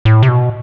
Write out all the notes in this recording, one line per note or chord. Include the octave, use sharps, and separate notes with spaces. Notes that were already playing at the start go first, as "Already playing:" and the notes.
A2
C3
B2